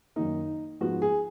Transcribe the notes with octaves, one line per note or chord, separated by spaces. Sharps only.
F#2 D#3 A#3 D#4
G#2 F3 B3 F#4
G#4